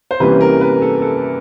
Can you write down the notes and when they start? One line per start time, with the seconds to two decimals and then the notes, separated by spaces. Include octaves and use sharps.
0.11 C5
0.20 C3 E3 G3 A#3 C#4 B4
0.41 A#4
0.61 B4
0.82 A4
1.02 A4